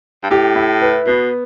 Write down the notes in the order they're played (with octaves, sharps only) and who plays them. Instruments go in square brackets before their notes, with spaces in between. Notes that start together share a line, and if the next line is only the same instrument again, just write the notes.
[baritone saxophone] G2
[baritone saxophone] A2 [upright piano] G4
[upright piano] E4
B4
[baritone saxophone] B2 [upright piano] B3